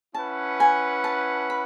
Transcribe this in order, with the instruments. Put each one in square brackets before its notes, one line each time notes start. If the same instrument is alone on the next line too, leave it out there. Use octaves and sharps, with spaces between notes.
[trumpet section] C#4 E4 B4 F#5 [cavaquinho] A5
[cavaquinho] G#5
A5
B5